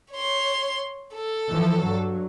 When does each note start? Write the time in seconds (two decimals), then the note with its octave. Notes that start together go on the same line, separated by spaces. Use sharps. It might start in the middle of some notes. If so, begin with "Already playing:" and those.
0.12 C#5 C6
1.15 A4
1.50 E3 F3
1.79 G2 F#3